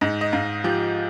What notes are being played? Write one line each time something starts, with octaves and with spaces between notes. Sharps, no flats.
G#2 D#5
D#5
G#2 F5
F3 G4